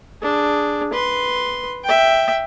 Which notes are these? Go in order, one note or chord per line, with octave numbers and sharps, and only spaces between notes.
D4 G#4
B4 C6
E5 G5